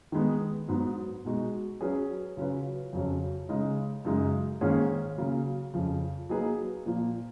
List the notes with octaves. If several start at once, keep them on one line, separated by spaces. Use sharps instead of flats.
D#3 G#3 B3
G#2 F#3 B3
B2 G#3 D#4 F#4
F#3 C#4 G#4 B4
C#3 F#3 C#4 F4 B4
F2 C#3 F#3 C#4
C#3 G#3 D#4
F#2 C#3 G#3 D#4
G#2 D#3 A#3 C#4 G#4
C#3 F#3 A#3
F2 C#3 F3
F#3 A#3 D#4 G#4 B4
A#2 F3 A#3